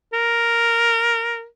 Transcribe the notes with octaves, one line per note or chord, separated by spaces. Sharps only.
A#4